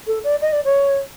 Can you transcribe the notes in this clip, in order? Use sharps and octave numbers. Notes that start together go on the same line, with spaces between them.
A4
D5
D#5
D5
C#5